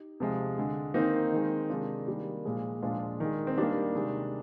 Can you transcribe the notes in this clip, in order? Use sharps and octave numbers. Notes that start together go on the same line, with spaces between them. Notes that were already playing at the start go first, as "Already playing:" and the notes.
Already playing: D#4 G4
C3 F3 G#3
D3 G#3
D#3 A#3 C4 D#4
D#3 G#3
C3 D#3 G#3 D4 F4
D#3 G3 A#3
A#2 F3 G#3
A#2 F3 G#3 D4 F4
D#3 G#3
C4
D#3 G3 A#3 D4
C3 D#3 G#3